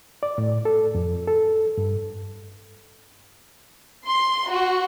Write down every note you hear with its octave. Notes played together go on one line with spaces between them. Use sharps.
D5
A2
A4
F2
A4
G2
C6
F#4